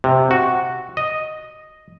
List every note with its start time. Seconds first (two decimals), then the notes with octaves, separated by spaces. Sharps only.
0.04 C3
0.31 F#4
0.97 D#5